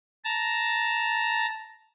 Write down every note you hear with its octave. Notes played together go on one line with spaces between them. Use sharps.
A5 A#5